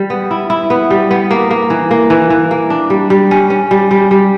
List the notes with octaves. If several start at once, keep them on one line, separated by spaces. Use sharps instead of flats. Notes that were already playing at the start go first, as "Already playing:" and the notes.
Already playing: G3
B3
E4
E4
B3
G3
B3
A#3
A#3
E3
A#3
E3
E3
A#3
D4
G3
G3
C#4
C#4
G3
G3
G3